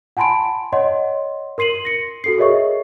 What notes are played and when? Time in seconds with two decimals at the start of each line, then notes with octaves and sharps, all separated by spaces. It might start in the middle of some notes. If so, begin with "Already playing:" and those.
0.17 F#5 G#5 A5 B5 C6 D7
0.73 C#5 D#5 F#5 C6
1.58 A#4 C6 C7 D#7 F#7
1.85 A#6 C#7
2.24 F#4 A4 C7
2.38 G#4 A#4 C#5 D#5 E5 C#6